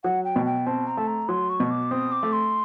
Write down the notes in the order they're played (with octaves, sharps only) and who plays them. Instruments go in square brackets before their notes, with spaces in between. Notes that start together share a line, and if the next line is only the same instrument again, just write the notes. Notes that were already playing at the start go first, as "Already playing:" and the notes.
[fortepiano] F#3 [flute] F#5
[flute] G5
[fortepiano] B2
[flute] G5
[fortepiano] C4 [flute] A5
[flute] A#5
[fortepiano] A3 [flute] A5
[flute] A#5
[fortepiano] F#3 [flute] C6
[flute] C#6
[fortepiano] B2
[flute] D6
[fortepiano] C4 [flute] D#6
[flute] D6
[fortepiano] A3
[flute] C6